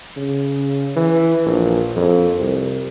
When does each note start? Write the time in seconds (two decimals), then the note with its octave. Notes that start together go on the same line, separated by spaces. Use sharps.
0.17 C#3
0.96 E3
1.46 A#1
1.96 F2
2.39 C2